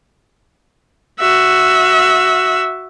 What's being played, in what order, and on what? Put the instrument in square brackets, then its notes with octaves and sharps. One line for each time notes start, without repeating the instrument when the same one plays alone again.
[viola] F#4 E5